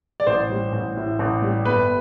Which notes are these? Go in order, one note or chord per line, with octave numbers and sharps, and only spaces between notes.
D5
A1 C5
G3
A1
A2
A1
G3
G1 B4